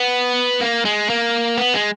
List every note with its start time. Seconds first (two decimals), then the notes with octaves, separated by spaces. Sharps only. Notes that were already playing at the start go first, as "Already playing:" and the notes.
Already playing: B3
0.61 A#3
0.85 G#3
1.10 A#3
1.58 B3
1.74 G#3